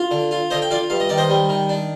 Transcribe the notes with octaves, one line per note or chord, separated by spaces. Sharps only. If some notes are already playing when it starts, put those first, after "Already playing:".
Already playing: F4
D3
F4
D3 C5 D#5
G5
F4 D5 F5
G2 F5
D#5
D#3 D5
C5 D#5
G3
D#3
D4